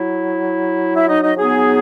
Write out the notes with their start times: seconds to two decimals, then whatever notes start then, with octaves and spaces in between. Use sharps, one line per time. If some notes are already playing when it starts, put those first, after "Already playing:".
Already playing: F#3 E4
0.95 E4 E5
1.09 D#4 D#5
1.23 D#4 D#5
1.37 F#3 B3 D#4 G#4